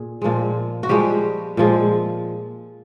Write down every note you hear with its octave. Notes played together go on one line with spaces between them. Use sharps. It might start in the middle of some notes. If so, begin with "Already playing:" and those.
Already playing: A#2 G#4
A#2 F3 G#3
F#4
A#2 F3 G3 G#3 G4
A#2 F3 G#3